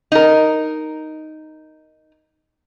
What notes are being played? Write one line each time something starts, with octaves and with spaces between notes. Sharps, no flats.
D#4 A#4